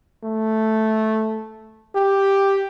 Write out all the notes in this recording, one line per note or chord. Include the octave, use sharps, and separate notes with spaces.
A3
G4